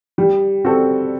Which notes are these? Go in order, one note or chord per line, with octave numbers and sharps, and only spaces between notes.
G3
C4 F#4 A4